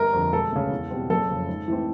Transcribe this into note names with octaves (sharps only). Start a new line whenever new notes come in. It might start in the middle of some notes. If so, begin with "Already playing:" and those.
Already playing: G1 A#4
F2 D3
E1 A4
D2 C#3
E2
B2 G3 C4
F#1 A4
F2 C#3
G#2
E3 A3 C4